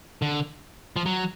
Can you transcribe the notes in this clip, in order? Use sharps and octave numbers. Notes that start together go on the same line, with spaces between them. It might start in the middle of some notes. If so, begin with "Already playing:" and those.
D3
F3
F#3